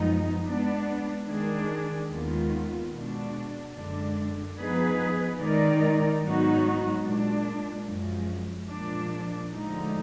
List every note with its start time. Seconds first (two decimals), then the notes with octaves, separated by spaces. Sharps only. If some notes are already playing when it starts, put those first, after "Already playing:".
Already playing: F#2 F3 G#3 B3 D#4
0.45 G#3 B3 D4
1.27 D#3 G#3 D4 G#4
2.09 D#2 D#3 G#3 B3 F4
2.92 B2 G#3 D4
3.75 F#2 D3 G#3 D4
4.58 F3 B3 D#4 G#4 B4
5.40 D#3 G#3 D#4 A#4 D5
6.22 G#2 F#3 B3 D#4 F#4
7.05 A#2 G#3 D4
7.88 F#2 F3 G#3
8.70 A#2 F3 G#3 D4
9.52 D2 D3 F3 G#3 D#4